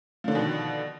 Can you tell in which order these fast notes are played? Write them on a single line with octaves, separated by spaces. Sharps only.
F3 D3 D#3 B2